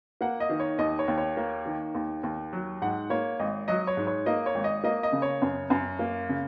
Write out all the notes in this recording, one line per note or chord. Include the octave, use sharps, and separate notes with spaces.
A#3 F#5
D#5
D#3
C#5
D#2 D#5
C#5
D#2
C#5
A#3
D#3
D#2
D#2
F#3
G#2 F#5
A#3 C#5
G#1 D#5
F#3 D#5
C#5
G#2
C#5
A#3 D#5
C#5
G#1
D#5
A#3 D#5
D#5
C#3
C#5
F#2
F#2
A#3
C#3